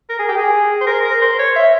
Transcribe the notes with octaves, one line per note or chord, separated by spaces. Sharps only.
A#4
G#4
G4
G#4
C5
A#4
A#4
C5
C#5
E5